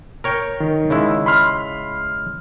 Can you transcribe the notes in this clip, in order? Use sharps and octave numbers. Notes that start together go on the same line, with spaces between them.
A#4 C#5 G5
D#3
C#3 G#3 E4
B5 C6 F6